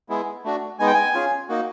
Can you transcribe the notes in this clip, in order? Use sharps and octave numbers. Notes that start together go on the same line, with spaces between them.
G#3 B3 E4 G#4
A3 D4 F#4
G#3 B3 D#4 G#5
G5
G#5
C#4 F4 G#4
A#3 D#4 F#4